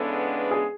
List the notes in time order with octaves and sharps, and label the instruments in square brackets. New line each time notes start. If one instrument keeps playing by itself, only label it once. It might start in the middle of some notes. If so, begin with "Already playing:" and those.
Already playing: [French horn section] C#3 E3 G#3 B3 D4 [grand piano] A4
[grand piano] G#4